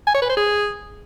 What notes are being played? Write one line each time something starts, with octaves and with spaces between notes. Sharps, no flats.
G#5
C#5
B4
C5
G#4